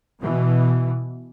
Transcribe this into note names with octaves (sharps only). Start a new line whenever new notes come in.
B2 E3